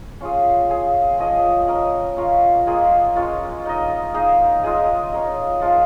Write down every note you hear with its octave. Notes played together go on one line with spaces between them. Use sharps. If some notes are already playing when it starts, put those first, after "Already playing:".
C#4 F4 G#4
C#4 G#4 F5
F3 C#4 G#4 D#5
C#4 A#4 D#5
C#4 F4 A#4 C#5
A#3 F4 G#4 D#5
G#3 C#4 F4 C#5
D#4 A#4 D#5
D#4 G#4 F5
G#3 F4 G#4 D#5
C#4 A#4 D#5
F3 G#3 F4